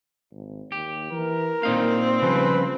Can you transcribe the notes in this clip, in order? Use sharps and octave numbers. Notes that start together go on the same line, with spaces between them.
G#1
D#2 G4
E3 A#4
A#2 A#3 C4 D#4 F5
C#3 F3 G3 B4